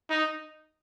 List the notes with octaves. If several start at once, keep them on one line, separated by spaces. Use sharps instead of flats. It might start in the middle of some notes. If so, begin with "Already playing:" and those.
D#4